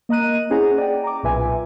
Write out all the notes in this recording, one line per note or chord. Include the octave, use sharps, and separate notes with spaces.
A#3 D#5 A#5 F#6 D#7
C#4 E4 G#4 C5 F#5 A#5
D5 G5
A#5 D6
B1 A#2 F4 B4 E5 G#5